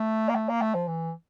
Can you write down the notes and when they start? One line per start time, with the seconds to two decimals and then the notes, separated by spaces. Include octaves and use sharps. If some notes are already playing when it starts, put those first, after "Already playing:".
Already playing: A3
0.29 A#3
0.35 A3
0.49 A#3
0.62 A3
0.75 F3
0.88 E3